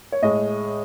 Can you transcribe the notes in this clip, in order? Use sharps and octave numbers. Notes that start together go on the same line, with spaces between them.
C#5
A2 G#3 D#5